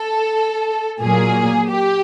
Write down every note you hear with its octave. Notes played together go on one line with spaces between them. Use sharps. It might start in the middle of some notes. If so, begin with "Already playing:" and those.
Already playing: A4
A#2 F#3 A#3 G#4
G4